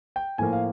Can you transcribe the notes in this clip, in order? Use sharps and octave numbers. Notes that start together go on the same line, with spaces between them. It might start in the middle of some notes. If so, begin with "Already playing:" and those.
G5
A2 F3 A#3 G#5
F5